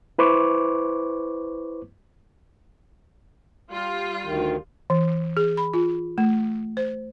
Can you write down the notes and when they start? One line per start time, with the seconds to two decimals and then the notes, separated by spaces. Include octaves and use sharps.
0.18 E4 B4 C5 C#6 D6
3.71 G3 F4
4.24 D2 D#3
4.90 E3
5.37 G#4
5.57 B5
5.74 F4
6.18 A3
6.77 C5